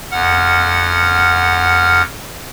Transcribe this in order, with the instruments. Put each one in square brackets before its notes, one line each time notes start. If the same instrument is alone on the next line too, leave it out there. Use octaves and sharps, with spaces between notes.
[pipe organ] F2 F#5 F6